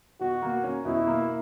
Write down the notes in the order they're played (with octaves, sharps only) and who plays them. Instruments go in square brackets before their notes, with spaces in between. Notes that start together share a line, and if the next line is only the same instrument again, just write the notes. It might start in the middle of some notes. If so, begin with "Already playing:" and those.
[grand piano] B2 [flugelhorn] F#4
[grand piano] A#3
C#4
[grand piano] B2 [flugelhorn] E4
[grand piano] A#3